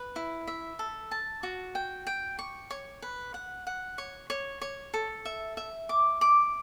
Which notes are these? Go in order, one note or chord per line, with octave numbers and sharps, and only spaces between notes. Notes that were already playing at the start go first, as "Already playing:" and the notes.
Already playing: B4
E4
E5
A4
A5
F#4
G5
G5
C#6
C#5
B4
F#5
F#5
C#5
C#5
C#5
A4
E5
E5
D6
D6